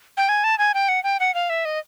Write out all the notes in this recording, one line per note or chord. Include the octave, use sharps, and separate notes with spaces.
G5
G#5
A5
G#5
G5
F#5
G5
F#5
F5
E5
D#5